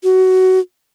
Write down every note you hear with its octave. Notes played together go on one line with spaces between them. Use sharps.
F#4